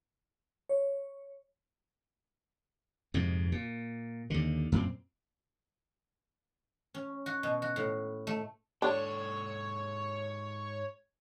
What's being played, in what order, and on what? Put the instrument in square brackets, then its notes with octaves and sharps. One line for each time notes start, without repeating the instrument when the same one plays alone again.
[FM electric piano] C#5
[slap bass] F2 G#2 C3
A#2
D#2 D3
F#2 A#2 C4
[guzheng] C#4
F#4
B2
F#4
A2
A3
[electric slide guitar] G#2 A4 [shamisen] D4 [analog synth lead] C#5